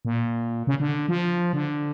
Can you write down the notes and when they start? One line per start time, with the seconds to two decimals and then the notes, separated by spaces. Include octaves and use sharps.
0.05 A#2
0.67 C#3
0.80 D3
1.08 F3
1.53 D3